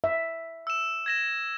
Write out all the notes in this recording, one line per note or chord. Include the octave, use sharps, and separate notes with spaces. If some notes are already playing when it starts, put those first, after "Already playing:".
E5
E6 E7
G#6 A#6 E7